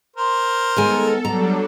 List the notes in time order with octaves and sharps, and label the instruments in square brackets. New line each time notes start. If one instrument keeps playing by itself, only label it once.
[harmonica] A#4 C5
[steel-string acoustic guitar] D#3 G#3 G#5 [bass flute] B3 [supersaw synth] A4
[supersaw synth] F#3 G3 D4 [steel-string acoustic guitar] A#5